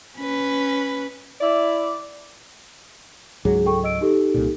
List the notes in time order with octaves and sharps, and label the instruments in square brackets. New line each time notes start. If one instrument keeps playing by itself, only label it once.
[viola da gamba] C#4 B4
[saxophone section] E4 D5
[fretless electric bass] C#2 G#2 F#3 [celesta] G#4
[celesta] A4 G5 C#6
D#5 E6 D7
D#4 G4 A4
[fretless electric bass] C2 A#2